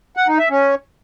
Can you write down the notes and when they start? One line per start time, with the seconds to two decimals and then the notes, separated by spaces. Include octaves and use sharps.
0.17 F#5
0.28 D#4
0.39 E5
0.50 C#4